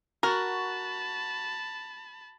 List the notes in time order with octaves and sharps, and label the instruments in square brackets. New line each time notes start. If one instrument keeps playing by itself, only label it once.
[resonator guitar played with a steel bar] F#4 [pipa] A#4 [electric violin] A5 B5